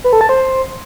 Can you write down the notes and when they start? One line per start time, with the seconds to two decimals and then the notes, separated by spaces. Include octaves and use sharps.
0.04 B4
0.13 A4
0.21 A5
0.29 C5